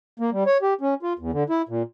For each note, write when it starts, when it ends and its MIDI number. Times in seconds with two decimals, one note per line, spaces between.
0.19 0.30 58
0.32 0.44 55
0.46 0.57 73
0.62 0.74 67
0.81 0.94 61
1.03 1.13 65
1.19 1.31 40
1.32 1.43 50
1.50 1.62 64
1.69 1.83 46